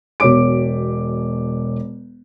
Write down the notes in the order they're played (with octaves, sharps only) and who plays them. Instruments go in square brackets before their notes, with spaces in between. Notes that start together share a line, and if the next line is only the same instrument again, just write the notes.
[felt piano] E1 B2 C#5 D6 D7